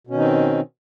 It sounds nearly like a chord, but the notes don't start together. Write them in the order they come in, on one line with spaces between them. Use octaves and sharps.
B2 C#4 D#3 D#4 C4